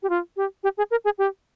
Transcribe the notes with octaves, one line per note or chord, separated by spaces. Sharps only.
G4
F4
G4
G4
G#4
A#4
G#4
G4